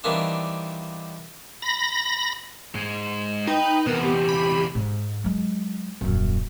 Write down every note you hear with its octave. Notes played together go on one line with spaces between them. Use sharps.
D#3 E3 G3 A#3 C4 D4
B5 A#6
G#2 G#3
D#4 B4 G5
E2 C3 B3 A#4
G4
B5
G#2
F#3 G#3
D#1 F#2